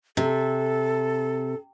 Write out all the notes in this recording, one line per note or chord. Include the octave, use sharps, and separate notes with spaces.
C3 A4